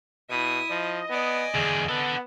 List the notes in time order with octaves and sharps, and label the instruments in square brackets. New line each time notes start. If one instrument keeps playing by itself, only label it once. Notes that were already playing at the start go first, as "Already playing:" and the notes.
[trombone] B2 [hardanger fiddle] E4 D#6
[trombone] F3 [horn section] D#5
[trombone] B3 [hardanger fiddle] D5 G#5
[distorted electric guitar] E2 D3 [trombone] G#4
[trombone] B3 [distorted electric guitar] A4 F#5